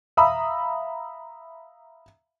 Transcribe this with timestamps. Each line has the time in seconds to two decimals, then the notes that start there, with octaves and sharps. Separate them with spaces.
0.17 E5 F5 A#5 B5 D#6 E6